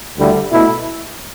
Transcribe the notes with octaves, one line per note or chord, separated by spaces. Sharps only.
D2 D3 G3 E4
B2 A3 E4